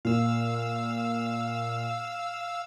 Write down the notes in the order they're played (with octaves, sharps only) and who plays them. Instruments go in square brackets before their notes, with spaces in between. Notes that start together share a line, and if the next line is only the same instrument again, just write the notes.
[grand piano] A#2 [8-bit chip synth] F5 E6